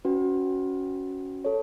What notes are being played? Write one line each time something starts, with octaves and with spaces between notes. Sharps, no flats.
C#4 F#4 B4
A4 C#5